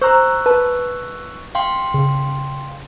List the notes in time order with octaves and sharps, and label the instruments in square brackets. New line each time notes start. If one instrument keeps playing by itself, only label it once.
[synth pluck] C5 A#5 [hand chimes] C#6 E6 F#6
[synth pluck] B4 A5
[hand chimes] F5 G5 C6
[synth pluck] C#3